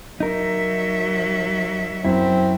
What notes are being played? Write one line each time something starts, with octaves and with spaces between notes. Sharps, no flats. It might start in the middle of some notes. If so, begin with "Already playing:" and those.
F#3 D#4 A#4 E5
F#2 C4 E4